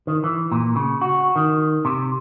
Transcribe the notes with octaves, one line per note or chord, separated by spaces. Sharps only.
D#3
E3
A#2
C#3
F#4
D#3
C3